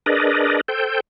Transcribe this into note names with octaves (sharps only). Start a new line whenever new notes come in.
D4 G#4 A#4 B4 D5 D#5
A4 C5 G5